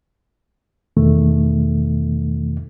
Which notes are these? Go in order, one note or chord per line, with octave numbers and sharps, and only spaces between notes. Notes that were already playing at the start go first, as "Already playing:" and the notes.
E2 B2 D#3 A3